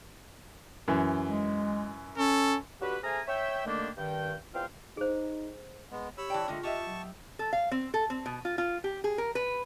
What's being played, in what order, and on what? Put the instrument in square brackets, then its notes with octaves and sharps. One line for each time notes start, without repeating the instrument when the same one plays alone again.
[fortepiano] F#2 E3
[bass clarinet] G#3
[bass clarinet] C#4 [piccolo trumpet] A4
[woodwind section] D3 F#4 G4 B4
A3 G#4 C5 G#5 A#5 F6
C#5 E5 G5
D3 D#3 A3 A#3 D4 G4
G2 D#3 G5
E2 C4 F4 F5 G5 F6
[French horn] D#4 [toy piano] G#4 C5
[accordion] G#3 B3
[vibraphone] G4 [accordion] C#5 B5 E6
[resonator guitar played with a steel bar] E3 G5 [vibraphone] D5 A5
[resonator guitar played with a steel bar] D3 G#3 A3 [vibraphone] F4
[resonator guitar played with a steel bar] G4 D#5 E5 [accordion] A5 C#6
[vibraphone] F#3
[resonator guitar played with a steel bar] A4
F5
C4
A4
C4
B2
F4
F4
G4
G#4
A#4
B4